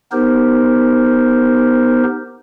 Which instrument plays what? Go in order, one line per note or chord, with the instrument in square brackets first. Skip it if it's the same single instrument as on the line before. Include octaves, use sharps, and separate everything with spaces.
[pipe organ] B3 D#4 G4 A#4 C5